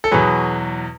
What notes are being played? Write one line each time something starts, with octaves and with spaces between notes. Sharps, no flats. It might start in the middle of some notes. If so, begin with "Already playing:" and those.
A4
E2 B2 F#3 G#4 B4